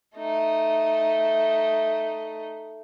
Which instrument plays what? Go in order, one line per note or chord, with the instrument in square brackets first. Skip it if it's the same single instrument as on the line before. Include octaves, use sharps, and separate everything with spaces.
[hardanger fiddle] A3 D#4